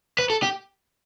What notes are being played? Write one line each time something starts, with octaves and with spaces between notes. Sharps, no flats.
B4
A4
G4